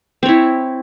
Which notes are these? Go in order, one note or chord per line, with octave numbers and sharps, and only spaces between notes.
C4 E4 C#5